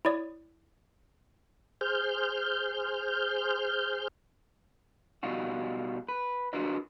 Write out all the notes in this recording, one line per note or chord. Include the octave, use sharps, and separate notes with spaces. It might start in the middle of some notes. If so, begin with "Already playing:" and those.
E4 C#5 D5 D#6
G#4 C5 F6 G6
B2 G3 D#4 F4 F#4
B4
D4 F4 F#4 A#4 B4 D#5